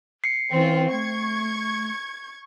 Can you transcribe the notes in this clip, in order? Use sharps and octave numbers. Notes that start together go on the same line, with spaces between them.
C7 C#7
E3 C4 C#4 F4
A3 C#6 G#6